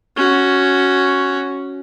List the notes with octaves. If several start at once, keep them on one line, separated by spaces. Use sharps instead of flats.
C#4 F#4